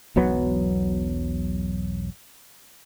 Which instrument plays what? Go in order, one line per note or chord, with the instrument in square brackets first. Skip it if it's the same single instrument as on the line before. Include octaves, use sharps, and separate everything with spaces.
[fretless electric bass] E1 B1 F#3 B3